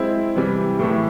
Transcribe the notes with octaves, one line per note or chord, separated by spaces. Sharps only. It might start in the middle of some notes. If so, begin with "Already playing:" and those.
Already playing: G#3 C4 E4
C3 E3 G3
A2 E3 A3